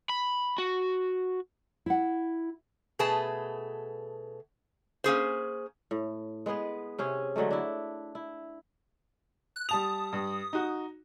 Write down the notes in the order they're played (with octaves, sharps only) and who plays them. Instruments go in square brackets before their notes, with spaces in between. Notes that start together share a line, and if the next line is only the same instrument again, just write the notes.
[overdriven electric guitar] B5
F#4
[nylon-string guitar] E4 F#5
[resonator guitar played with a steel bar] B2 A3 G#4 B4 A5
A#3 C#4 G#4 C5
[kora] A2
G#3 B3 G#4 B4
C3 C#4 G#4
D3 F#3 G#3 A3
D4 E4
E4
[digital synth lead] F#6
[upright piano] G3 A5 F7 [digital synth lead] D#6
[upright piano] G2
D#4 F#4